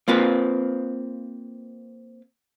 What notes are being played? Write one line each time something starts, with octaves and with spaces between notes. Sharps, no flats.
A#3 C4 F4 B4